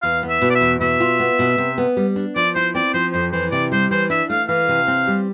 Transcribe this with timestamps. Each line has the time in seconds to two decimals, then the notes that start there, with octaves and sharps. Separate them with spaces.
0.02 E2 F5
0.23 B3
0.29 E5
0.42 B2
0.50 D5
0.55 E5
0.61 E2
0.81 B2 E5
1.00 F4
1.20 B3
1.39 B2
1.58 C3
1.78 B3
1.97 G3
2.16 D4
2.36 F3 D5
2.55 E4 C5
2.75 C4 D5
2.94 F3 C5
3.13 F2 C5
3.32 E3 C5
3.52 C3 D5
3.72 G3 C5
3.91 E3 C5
4.10 D4 E5
4.30 A3 F5
4.49 E3 F5
4.69 C3
4.88 C4
5.07 G3